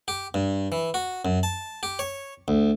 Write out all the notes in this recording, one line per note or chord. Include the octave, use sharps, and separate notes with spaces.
G4
G2
E3
F#4
F#2
A5
G4
C#5
D2